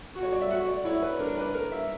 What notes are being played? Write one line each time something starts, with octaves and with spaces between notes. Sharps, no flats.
F#4
C#5
D5
E5
F#4 F#5
D5
E4 C#5
B4
D4 A#4
B4
A#4
E5